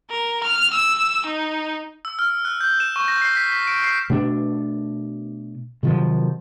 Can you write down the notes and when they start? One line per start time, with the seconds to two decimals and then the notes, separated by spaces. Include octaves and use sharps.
0.10 A#4
0.43 F6
0.73 E6
1.26 D#4
2.05 E6
2.19 F6
2.45 F#6
2.61 G6
2.80 E7
2.96 C#6
3.08 A#6
3.22 C7
3.37 B6
3.52 B6
3.67 D7
3.84 C7
4.10 B2 A3 D4
5.83 C3 D#3 F3 F#3